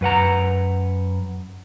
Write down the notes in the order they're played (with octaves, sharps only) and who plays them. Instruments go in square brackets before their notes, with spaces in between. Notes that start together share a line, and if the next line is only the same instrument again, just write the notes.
[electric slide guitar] F#2 B4 F#5 A#5